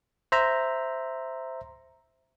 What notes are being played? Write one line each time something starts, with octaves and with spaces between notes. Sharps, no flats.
C5 E5 A#5